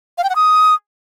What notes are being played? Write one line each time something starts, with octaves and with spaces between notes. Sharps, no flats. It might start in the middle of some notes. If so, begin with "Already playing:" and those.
F5
G5
F#5
D#6